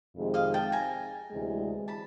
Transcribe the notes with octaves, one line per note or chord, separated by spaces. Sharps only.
F2 C3 D#3 G#3
D#5 F5
G5 A5
G#5 A#5
D2 C3 E3 G#3
A5 B5